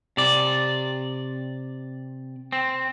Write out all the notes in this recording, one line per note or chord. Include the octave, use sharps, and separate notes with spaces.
C3 D5
C4